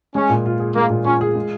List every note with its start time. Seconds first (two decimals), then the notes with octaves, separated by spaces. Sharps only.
0.15 G#3 C#4
0.30 A#2
0.46 F4
0.60 G#4
0.76 G#3 A#3
0.90 A#2
1.05 C#4 F4
1.21 G#4
1.35 G#3